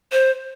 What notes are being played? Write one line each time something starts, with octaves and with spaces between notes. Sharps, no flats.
C5